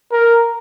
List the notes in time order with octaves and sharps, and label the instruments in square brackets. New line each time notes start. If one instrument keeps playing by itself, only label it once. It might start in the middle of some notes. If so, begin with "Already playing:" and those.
[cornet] A#4